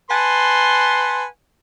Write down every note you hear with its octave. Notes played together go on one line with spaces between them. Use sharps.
B4 F#5 G#5 A5 C6